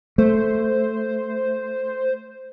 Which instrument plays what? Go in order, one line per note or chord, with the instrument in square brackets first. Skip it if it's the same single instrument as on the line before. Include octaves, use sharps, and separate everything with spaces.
[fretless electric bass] A3 [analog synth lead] C5